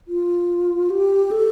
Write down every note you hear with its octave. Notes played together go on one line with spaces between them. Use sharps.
F4
G4
A4